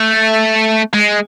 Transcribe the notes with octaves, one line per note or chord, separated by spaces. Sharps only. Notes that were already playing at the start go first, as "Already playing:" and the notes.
Already playing: A3
G#3